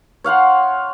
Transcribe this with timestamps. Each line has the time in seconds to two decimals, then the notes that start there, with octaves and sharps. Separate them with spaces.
0.24 C#5 F5 F#5 C6